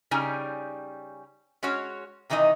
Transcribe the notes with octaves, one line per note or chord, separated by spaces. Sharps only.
C#3 G3 C#4 D#4 G#5
G#3 C#4 F#4 C#5
C3 D#3 E3 D#4 D#5